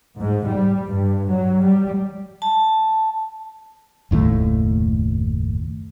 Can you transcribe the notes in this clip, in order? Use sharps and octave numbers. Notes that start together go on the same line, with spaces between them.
G#2
G3
G2
F#3
G3
A5
F#1 D#2 A2 A3